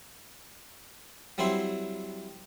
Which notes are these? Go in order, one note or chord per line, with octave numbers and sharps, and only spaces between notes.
F#3 G3 C4 E4 C5